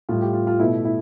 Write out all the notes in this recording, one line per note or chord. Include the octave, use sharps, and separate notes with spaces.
A2 G3 F4
G4
F4
F4
B2 A3 E4
E4